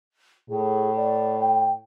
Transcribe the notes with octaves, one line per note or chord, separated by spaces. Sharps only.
A2 G#4
D5
G5